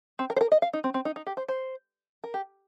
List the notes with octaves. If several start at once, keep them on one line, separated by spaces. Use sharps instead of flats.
C4
A#4
C5
A#4
D#5
F5
D#4
C4
C4
D#4
D#4
G4
C5
C5
A#4
G4